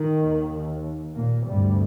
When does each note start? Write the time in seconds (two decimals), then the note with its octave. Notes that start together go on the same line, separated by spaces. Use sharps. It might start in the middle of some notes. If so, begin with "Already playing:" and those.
Already playing: D#3
0.21 D#2
1.16 A#2 A#3
1.47 D2 G2 C3 G3